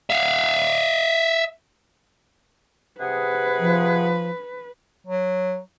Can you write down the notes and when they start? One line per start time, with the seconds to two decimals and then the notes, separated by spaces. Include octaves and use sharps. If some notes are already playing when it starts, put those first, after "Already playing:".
0.10 E5 F5
3.00 C3 G#4 B4 F#5
3.60 F3
5.07 F#3